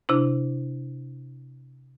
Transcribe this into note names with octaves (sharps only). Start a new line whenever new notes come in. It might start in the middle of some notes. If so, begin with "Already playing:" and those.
C3 D4 E4